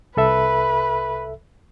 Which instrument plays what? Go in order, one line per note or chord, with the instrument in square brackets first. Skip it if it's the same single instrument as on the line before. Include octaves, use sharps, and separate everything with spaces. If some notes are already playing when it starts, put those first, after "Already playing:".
[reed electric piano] C2 A4 E5 [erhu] B4